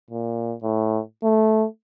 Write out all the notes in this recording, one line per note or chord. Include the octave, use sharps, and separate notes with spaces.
A#2
A2
A3